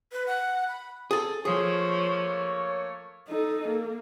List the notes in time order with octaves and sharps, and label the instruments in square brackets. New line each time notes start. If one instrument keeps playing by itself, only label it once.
[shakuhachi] B4
F#5
B5
[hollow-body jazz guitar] G#4 A4
[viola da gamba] F3 [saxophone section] A3 A#3 C#5 [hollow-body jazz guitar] G#4
[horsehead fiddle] D#4 A4
A#3